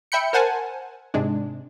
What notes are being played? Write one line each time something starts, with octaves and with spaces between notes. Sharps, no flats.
E5 G5 B5 G6 C#7
A#4 C5 F#5 G#5 A5
G#2 C3 G#3 D4